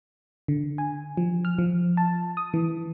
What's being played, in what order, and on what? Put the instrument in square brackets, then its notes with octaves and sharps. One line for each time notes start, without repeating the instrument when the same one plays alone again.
[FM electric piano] D3
G#5
F3
F6
F3
A5
D#6
E3